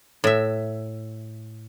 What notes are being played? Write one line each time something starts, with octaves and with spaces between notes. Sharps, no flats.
A2 E5